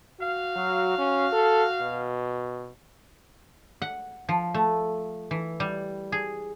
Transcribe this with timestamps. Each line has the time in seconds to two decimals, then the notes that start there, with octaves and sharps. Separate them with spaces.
0.20 F#4 F5
0.56 F#3
0.98 C#4
1.32 A4
1.82 B2
3.82 F#5
4.29 F3
4.54 A3
5.31 E3
5.60 G3
6.12 G#4